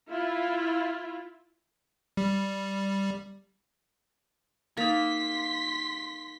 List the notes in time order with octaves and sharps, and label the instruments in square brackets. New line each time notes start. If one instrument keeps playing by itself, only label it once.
[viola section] E4 F4
[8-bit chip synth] G3
[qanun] A#3 [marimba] D#4 A6 [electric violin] C6 B6